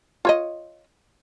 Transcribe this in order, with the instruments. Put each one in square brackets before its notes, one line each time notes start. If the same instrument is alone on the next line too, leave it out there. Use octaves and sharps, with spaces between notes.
[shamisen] F4 C#5 D#5